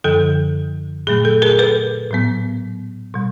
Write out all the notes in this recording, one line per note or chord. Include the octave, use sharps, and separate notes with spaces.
F#2 D3 F3 A4
A#2 F#3 A3 G#4
A4
G#4 A#4
A4 B4
A2 F#3 B3
B2 G3